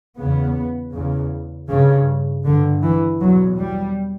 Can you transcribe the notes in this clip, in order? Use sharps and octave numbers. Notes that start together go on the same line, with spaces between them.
E2 C#3 B3
E2 C#3
G2 C#3
G2 D3
E3
E2 B2 F#3
G3